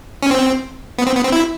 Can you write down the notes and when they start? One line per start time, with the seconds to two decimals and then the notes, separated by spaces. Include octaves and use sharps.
0.23 C#4
0.31 C4
0.98 B3
1.07 C4
1.16 B3
1.24 C4
1.32 E4